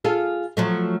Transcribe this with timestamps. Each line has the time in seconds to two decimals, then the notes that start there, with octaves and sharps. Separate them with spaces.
0.05 F4 G#4 A4
0.57 F3 F#3 A3